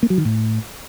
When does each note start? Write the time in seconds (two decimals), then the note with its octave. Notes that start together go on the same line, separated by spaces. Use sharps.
0.03 A#3
0.10 F#3
0.18 D#3
0.25 A2